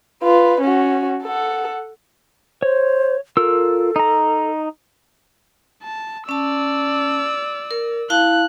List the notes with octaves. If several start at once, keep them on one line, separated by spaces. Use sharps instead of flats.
F4 B4
C#4 F#4
A4 F#5
C5 C#5
F4 A4 A#4 E6
D#4 A#5
A5
C#4 D5 A5 E6
A#4
E4 F5 A5 F#6